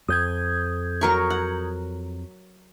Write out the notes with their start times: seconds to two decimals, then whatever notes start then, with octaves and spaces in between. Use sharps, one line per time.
0.08 F2 D#6 G6 G#6
1.01 F#3 A#4 C#6
1.30 F#5